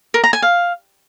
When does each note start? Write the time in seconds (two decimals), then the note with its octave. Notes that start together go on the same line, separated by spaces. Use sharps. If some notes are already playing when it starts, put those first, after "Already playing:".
0.14 A#4
0.24 A#5
0.33 G#5
0.42 F5